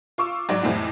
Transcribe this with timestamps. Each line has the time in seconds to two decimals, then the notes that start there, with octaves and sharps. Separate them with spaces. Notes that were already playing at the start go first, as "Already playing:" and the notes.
0.18 F4 C#6 D6 E6
0.49 G#2 F#3 D5
0.63 F2 A2 C3 E3